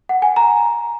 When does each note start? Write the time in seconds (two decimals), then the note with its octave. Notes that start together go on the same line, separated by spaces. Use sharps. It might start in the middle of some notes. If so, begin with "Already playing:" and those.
0.09 F#5
0.22 G#5
0.36 A#5